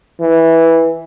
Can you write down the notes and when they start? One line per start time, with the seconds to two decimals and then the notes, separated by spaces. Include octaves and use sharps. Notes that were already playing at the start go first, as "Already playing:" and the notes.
0.20 E3